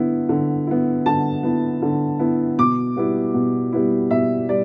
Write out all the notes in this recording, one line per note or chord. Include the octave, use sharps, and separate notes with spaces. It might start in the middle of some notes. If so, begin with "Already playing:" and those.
Already playing: D3 B3 E4
D3
B3 E4
D3 A5
B3 E4
D3
B3 E4
B2 D6
G3 B3 E4
B2
G3 B3 E4
B2 E5
G3 D5